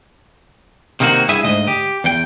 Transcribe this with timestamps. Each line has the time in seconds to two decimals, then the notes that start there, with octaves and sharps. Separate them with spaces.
1.00 C3 D#3 A#3 C4 F#4
1.29 G2 E4 G#4 E5 G#5
1.44 D2 G#2 D#5
1.67 G4
2.04 E2 G5